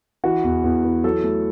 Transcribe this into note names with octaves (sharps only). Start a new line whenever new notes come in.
E3 F#4
E2
E2
E3
F#3 A4
A3